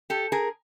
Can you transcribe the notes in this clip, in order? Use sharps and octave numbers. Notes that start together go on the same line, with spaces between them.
G4 A4
G#4 A#4